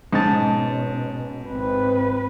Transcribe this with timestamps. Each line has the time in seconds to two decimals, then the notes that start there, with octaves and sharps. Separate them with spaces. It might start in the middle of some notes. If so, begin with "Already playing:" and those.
0.13 G#2 B2 C#4 A5
1.50 G#1 C4 B4